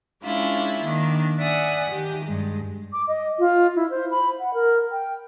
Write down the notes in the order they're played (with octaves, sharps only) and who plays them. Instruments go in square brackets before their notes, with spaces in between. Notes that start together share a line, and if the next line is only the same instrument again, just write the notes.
[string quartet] G#3 C#4 D4 E4 F4
D#3 A#3 D4
D5 E5 F#5 G#5 D#6
D#3 G4
G2 G#3
[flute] D6
D#5
F4
E4
C5
B5
F#5
A#4
G5